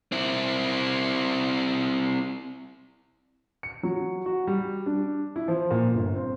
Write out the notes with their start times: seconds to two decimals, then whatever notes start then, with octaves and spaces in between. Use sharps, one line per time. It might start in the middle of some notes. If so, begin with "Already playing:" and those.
0.12 C4 E4
3.63 C#7
3.83 F#3
4.26 F#4
4.47 G3
4.86 D4
5.36 E4
5.48 F3
5.71 A#2
5.94 G1
6.15 C4